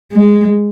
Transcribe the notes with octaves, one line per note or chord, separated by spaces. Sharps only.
G#3